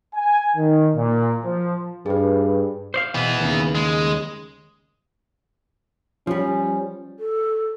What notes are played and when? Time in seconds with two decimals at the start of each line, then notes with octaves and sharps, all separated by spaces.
0.15 G#5
0.56 D#3
0.95 A#2
1.44 F3
2.06 G2 G#4 B4
2.94 C5 D5 F5
3.15 B2 E3 B3
3.40 D#2 C#3
3.75 G#3
6.27 F3 G3 C#4
7.19 A4